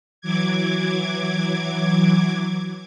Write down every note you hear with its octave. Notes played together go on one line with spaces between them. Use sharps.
E3 F#3 D6 G#6